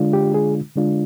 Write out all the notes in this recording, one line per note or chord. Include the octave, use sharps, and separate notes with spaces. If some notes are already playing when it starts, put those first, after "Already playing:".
Already playing: D3 G#3 D4 F4
G4
G#4
D3 G#3 D4 F4